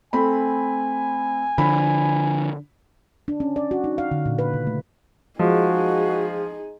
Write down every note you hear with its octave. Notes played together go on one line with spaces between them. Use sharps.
A3 C4 G#5 B5
D3 F3 B5
D4
C#4
D5
F#4
D#4
F5
D3
A#2
B4
C#3
A3
F3 G#3 D#4 F#4 G#4